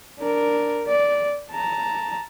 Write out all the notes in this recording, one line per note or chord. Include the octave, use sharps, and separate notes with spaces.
D4 A#4
D5
A5 A#5